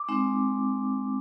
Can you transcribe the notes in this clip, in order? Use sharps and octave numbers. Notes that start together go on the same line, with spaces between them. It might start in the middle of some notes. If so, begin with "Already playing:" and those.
Already playing: D6
G#3 C4 D#4